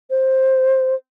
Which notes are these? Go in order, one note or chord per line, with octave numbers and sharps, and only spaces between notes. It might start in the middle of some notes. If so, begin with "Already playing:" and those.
C5